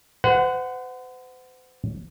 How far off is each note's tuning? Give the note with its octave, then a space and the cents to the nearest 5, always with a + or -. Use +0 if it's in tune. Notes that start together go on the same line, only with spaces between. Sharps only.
C5 -45 F#5 +0